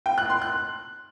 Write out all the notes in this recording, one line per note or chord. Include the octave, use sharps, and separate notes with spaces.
G5
F#6
C6
F#6